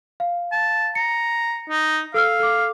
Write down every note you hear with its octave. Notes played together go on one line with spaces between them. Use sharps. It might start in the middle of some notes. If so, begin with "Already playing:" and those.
F5
A5
A#5 C#7
D#4
A4 F5 E6 F6
A4 D6